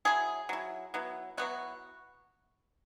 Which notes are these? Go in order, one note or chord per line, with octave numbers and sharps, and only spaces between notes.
F#3 E4 G#4
F#3 E4
F#3 B3 E4
F#3 B3 E4 F#4